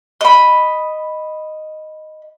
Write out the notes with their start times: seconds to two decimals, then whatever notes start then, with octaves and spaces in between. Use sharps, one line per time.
0.21 D#5 B5